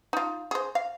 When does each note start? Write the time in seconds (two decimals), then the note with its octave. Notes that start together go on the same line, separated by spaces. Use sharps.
0.13 D#4 F4
0.51 G#4 C5
0.75 F5